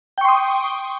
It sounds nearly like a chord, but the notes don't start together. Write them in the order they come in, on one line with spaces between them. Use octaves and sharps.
G5 C#6 C6 D#6